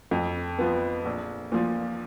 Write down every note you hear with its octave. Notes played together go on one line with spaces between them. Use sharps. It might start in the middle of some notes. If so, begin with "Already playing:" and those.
F2
F3 B3
A#1
A#2 F3